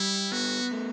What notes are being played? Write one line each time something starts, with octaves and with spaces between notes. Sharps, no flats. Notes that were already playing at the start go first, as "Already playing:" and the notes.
Already playing: G3 E4
B3 F#4
A3